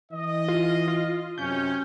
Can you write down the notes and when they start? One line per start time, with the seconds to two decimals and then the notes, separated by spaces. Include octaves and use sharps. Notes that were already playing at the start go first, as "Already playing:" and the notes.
0.12 E3 D#5
0.48 F4
0.88 F4
1.38 F#2 C3 C#4 G6